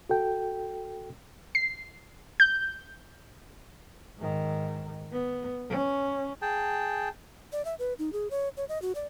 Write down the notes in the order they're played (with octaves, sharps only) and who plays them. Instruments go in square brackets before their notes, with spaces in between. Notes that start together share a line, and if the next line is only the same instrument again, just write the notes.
[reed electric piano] F#4 A4 G5
[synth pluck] C7
G6
[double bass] G#2 D#3
B3
C#4
[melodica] G#4 G5 A5
[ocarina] D5
E5
B4
D#4
G#4
C#5
C#5
D#5
F#4
D5